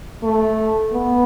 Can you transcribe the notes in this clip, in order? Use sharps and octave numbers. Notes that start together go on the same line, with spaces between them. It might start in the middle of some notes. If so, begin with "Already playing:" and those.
A3
B3